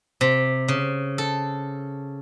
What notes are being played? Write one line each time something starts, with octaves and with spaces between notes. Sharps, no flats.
C3
C#3
A4